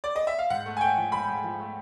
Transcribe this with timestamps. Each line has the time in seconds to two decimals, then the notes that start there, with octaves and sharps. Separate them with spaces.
0.04 D5
0.16 D#5
0.27 E5
0.39 F5
0.50 G#2 F#5
0.66 A3
0.77 G#5
0.81 A3 G5
0.97 F3
1.12 G#2 B5
1.28 G#2
1.44 F3
1.60 A3